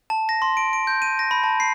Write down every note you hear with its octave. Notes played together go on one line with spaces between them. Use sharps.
A5
A#6
C6
D7
D7
G6
D#7
A#6
B5
A5
C7